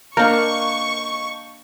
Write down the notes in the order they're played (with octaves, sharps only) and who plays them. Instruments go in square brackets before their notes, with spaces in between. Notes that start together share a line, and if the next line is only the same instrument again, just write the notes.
[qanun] A#3 D4 [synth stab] A#4 [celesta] D#5 A5 G6 [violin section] C#6